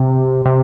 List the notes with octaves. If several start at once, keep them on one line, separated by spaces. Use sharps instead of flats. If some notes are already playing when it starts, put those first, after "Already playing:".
Already playing: C3
C3